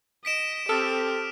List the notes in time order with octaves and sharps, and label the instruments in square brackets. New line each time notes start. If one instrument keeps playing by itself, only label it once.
[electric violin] D#5 [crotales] B6 D7 E7
[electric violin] C4 G4 [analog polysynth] A4 [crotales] D#6 F6